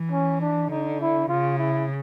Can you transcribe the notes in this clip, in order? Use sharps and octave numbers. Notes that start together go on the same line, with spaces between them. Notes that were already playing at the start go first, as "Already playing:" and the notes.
Already playing: E3
C#4
D4
D3 D#4
E4
C#3 F4
E4